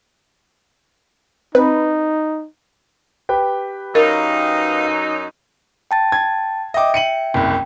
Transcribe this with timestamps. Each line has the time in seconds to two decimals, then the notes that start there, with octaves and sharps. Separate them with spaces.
1.55 C4 D#4 B4
3.29 G4 B4 G5
3.95 F#2 F#3 D#4 A#4 D#5 F5
5.91 G5 A5 A6
6.12 G#6
6.74 D#5 E5 G5 D6
6.94 C#7 D#7 F#7
7.34 F#1 C2 G5